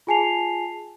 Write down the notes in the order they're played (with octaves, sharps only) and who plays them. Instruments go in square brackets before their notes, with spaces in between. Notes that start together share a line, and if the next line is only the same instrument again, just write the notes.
[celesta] F4 G#4 G#5 A5 C7 F7